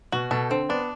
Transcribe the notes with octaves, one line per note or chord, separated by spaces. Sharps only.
B2 F#4
B2 A4
D3 C4
B3 D4